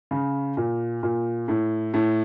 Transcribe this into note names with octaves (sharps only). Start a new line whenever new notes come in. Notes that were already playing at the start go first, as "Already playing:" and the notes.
C#3
A#2
A#2
A2
A2